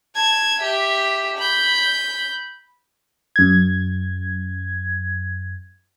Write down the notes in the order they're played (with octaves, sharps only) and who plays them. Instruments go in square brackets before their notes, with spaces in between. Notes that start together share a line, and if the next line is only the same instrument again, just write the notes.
[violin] A5 G#6
G4 E5
B5 G6
[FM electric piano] F#2 G#6